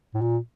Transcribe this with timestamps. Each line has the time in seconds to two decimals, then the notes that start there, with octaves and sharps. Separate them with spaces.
0.14 A2
0.22 A#2